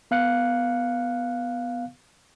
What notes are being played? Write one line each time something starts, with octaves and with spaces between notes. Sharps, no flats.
B3 F5 F#6 C#7